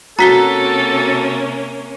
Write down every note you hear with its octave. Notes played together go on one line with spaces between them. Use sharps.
C3 A#3 C#4 F#4 A4 A#5 B6 G7